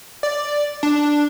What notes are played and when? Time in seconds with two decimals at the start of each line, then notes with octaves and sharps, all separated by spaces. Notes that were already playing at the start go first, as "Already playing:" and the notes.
0.23 D5
0.83 D4